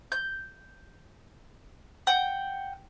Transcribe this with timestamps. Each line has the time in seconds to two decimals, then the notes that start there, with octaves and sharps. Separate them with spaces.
0.12 G6
2.07 F#5 G5